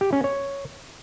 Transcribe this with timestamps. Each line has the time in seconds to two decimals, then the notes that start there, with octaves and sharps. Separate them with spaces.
0.01 G4
0.13 C#4
0.24 C#5